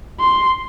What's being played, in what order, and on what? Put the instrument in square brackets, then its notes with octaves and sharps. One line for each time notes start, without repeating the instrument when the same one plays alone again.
[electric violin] C6